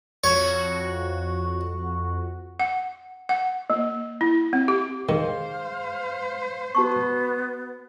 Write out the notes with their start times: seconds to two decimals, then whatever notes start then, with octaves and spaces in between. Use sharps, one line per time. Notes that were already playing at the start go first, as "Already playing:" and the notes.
0.24 F2 F#4 C#5
2.60 F#5
3.29 F#5
3.70 A#3
4.21 E4
4.53 C4
4.68 G4
5.09 D#3 G#4 C5 F5 G5
6.75 B3 F#4 A5 C#6